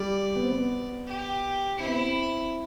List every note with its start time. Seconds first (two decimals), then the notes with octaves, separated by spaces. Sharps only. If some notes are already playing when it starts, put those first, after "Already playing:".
Already playing: G3 D5
0.35 B3
0.43 C4
0.52 B3
1.07 G4
1.79 C4 E4
1.87 B3
1.94 C4